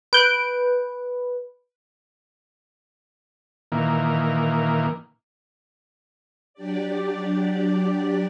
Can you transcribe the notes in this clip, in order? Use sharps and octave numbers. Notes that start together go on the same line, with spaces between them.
B4 F#6 G6 D7
A#2 D#3 E3 A#3
F#3 D4 G4 D5